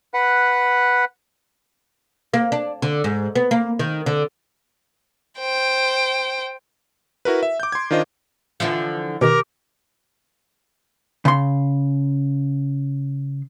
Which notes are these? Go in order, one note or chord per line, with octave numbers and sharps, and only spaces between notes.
B4 F#5
A#3
D4
D3
G#2
B3
A#3
D#3
D3
C5 G5
E4 F#4 A#4 B4
E5
D6 G6
C6 G#6
D#3 D4 F4 C5 D#5
D3 E3 F3
B2 D#3 G4 A#4 D6
C#3 C6